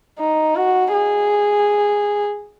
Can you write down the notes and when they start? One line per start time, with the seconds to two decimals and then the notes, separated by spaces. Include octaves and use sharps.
0.19 D#4
0.56 F#4
0.93 G#4